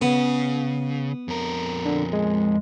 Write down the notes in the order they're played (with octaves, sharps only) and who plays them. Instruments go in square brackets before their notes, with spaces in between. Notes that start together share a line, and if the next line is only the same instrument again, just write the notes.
[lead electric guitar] C#3 [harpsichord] B3
[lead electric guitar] F2 A#4
[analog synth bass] D3
G#3